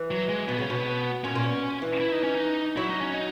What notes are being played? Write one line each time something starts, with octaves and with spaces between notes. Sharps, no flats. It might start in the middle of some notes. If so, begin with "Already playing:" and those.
Already playing: E3
F#3
G#3
B2 B3
C#3 C#4
B2 B3
A#2 C#4
A#2
B2
E3
E4
D#4
C#4
D#4
F#3 E4
D#4
C#4
D#4